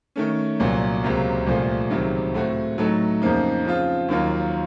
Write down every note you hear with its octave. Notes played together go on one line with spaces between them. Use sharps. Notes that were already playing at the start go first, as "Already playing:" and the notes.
D#3 A3 C#4
C2 A#2 F#3
C#2 C3 F#3 A#3
C2 A#2 F3 A3
C#2 C3 D#3 F#3
A2 A3 C4 F#4
A2 F#3 A3 D#4 A4
F2 C#3 F3 A#3 D#4
C#3 F3 C4 F4
D#2 D#3 F#3 A#3 F4